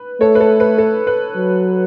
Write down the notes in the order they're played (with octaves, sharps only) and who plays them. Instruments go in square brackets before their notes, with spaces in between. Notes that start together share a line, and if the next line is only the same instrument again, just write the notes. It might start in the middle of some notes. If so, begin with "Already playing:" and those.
Already playing: [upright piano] B4
[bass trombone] A3 [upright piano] A4 C#5
[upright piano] B4
A4
B4
A4
B4
[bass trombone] F#3